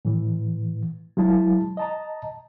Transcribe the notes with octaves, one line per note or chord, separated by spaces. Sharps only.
A2 E3
F#3 G#3 E4 A5
D#5 A5 A#5